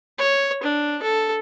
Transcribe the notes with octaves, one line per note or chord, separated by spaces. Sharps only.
C#5
D4
A4